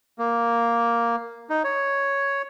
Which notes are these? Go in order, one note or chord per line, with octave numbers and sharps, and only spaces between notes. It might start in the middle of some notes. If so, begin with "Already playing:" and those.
A#3
D#4
C#5